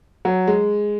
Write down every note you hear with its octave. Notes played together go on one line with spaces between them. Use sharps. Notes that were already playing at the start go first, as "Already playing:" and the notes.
F#3
G#3